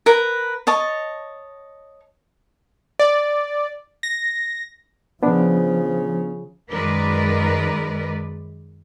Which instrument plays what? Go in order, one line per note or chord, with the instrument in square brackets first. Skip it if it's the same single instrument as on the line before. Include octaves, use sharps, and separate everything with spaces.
[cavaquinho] A#4 B4 A#5
C#5 D#5 A5
[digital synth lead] D5
A#6
[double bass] C#3 [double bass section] F3 [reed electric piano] B3 D4
[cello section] F#2 D#3 G#3 A#4 B4 D5